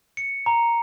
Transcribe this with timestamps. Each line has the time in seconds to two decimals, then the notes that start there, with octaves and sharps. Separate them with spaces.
0.17 C#7
0.46 A#5